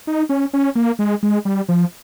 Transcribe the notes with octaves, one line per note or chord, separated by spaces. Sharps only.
D#4
C#4
C#4
A#3
G#3
G#3
G3
F3